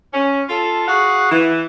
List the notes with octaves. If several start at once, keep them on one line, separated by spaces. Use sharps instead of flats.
C#4
F4 A4
F#4 G#4 F5 F#5
E3